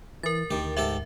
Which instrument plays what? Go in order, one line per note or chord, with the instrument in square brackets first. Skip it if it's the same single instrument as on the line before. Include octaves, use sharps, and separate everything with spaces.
[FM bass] E3 [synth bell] A#4 A6
[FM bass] D2 [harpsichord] D#3 G4
[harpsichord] G#2 G4 A4 [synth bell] E5